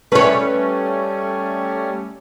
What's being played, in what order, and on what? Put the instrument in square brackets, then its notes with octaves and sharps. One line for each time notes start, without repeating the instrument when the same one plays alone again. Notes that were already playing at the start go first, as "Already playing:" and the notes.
[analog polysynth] G3 A3 C#4 [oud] B4 C#5